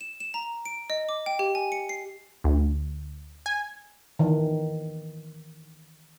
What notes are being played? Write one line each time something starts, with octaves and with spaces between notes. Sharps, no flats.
E7
E7
A#5
D7
D#5
D6
G5
G4
G#5
C#7
C7
D2
G#5
D#3 E3